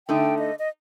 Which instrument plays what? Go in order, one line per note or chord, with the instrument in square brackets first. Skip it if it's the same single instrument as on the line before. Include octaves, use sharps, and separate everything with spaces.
[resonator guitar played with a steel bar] D3 A3 D#4 [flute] G5
[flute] D#5
D#5